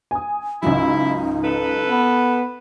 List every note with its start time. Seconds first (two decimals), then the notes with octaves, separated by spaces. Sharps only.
0.11 G#5 D#6
0.62 C#2 G#2 F#3 D#4 E4
1.44 A4 B4
1.90 B3